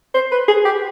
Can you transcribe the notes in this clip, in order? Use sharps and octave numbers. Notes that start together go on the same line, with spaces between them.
C5
B4
G#4
G4